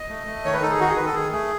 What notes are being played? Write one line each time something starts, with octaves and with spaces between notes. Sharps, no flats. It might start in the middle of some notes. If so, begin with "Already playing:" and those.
Already playing: D#5
A3
A3
D#3 C#5
B4
D#4 A4
G#4
D#3 F#4
G#4
D#3 B4
A4
D#3 G#4
A3 G#4